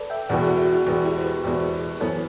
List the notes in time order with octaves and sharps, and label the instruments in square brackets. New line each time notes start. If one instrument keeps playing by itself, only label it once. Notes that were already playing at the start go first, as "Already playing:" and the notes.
Already playing: [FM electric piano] A4 B4 D5
E5 G5
[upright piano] E1 E2 B2 [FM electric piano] D5 F#5
[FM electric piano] F#4 A4
F#4
E4
[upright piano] E1 E2 B2 [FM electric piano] F#4
[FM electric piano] E4 G4
C5
G4 B4
[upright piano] E1 E2 B2
[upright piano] F#2 E3 B3 [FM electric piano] A4 C5